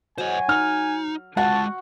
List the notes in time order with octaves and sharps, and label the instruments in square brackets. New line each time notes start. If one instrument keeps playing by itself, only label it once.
[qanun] F#3 [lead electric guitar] C5 D#5 [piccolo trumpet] G#5
[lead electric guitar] D#4 [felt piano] F6
[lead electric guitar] G#3 F4 [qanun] F#4 [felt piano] F#5 [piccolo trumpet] A5